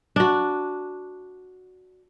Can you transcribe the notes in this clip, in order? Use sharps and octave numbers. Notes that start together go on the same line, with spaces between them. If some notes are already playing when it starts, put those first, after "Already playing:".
D4 F#4